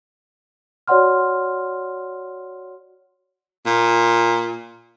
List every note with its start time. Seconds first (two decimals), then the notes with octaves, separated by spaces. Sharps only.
0.88 F#4 C#5 D5 F#5 C6 F6
3.66 A#2